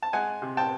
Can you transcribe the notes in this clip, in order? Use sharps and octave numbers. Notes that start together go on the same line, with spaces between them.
A5
G#3 F#5 G#5
C3
G5 A5